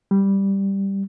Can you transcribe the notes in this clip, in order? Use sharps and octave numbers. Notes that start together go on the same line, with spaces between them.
G3